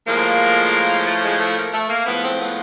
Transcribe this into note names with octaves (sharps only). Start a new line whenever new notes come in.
A2 F3 G#3 A#3
A3
G#3
A3
A#3
A3
A#3
A2 F3 G#3 B3
C4
B3